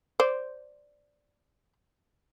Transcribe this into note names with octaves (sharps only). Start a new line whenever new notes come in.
C5 D5